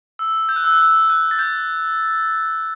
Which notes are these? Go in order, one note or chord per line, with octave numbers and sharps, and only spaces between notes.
E6
G6
F#6
E6
F#6
E6
F#6
A6
G6